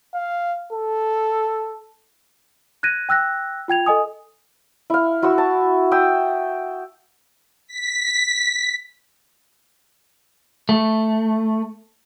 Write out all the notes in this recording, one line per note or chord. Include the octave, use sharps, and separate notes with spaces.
F5
A4
F#6 G#6 A#6 D#7
G5 E6 F#6 A#6
F4 G5 G#6 F7
A4 D#5 G#5 D#6
E4 F5
E4 F#4 C#6 E6
A5
E5 G5 D#6 E6
B6
A3